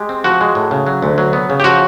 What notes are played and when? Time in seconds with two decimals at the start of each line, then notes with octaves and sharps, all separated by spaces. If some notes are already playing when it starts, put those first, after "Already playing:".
Already playing: G#3 G4
0.09 C4
0.24 F3 F#4
0.41 G#3
0.55 A2
0.71 C#3
0.87 F#3
1.02 D2
1.18 F#3
1.33 B3
1.50 C#3
1.60 G4
1.64 F3 F#4